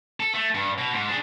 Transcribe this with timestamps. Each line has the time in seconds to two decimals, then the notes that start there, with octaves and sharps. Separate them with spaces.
0.20 A4
0.34 A3
0.55 G2
0.78 B2
0.94 G#2
1.08 D4 G#4